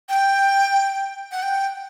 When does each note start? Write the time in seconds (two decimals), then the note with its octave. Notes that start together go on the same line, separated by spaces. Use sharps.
0.09 G5
1.32 F#5
1.43 G5